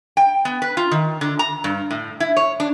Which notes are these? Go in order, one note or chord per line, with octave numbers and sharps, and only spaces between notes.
G5
B3
B4
F4
D#3
D3
A#5
G2
A2
E4
C#5
D4